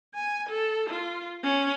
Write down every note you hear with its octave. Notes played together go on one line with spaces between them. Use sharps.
G#5
A4
F4
C#4